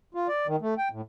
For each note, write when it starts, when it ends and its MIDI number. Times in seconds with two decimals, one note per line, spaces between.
0.14 0.27 65
0.28 0.47 74
0.47 0.56 51
0.61 0.74 57
0.78 0.89 79
0.91 1.01 45